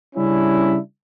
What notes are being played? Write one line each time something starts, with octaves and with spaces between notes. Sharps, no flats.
C#3 G3 C#4 D4 E4